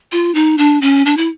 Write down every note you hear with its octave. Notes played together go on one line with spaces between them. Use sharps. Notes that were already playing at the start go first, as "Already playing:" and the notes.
F4
D#4
D4
C#4
D4
E4